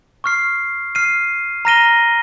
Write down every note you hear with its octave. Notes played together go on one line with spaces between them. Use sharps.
C#6 F6 C7
F6 C7 D#7
A#5 F6 A#6 D#7 G7